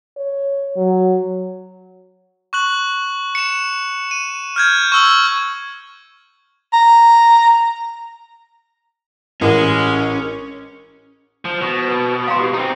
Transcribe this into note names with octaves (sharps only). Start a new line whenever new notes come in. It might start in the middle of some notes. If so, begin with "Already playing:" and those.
C#5
F#3
C#6 F#6 F#7
C#7 E7
D#7
F6 G6 G#6
C#6 E6 F#7
A#5
A1 G#3 C#4 A#4
F3
B2 C5 C#6
B4 B5 D#6
F5 A#5 C6
G4
C4 D#4